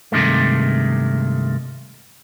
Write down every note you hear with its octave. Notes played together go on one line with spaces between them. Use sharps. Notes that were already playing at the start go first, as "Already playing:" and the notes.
G2 C3 D#3 G#3 A3